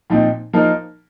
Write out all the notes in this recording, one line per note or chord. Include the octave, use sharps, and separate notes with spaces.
A#2 F3 C4 D#4
F3 A#3 D#4 A#4